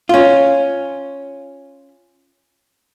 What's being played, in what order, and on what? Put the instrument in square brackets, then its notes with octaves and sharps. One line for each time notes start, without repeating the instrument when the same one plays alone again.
[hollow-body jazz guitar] C#4 F4